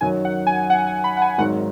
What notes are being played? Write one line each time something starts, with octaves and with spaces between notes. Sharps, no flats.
F#2 D#3 F#3 G#5
F#5
G#5
F#5
G#5
B5
F#5
G#5
G#1 G#2 D#3 F#3 F#5